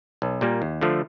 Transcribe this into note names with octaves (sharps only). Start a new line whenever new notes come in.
B1
A#2 G3 A#3
D#2
D3 F3 A3